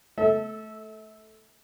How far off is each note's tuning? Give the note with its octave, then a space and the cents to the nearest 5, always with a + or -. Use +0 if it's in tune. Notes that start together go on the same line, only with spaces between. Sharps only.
A3 -10 A4 +0 E5 -35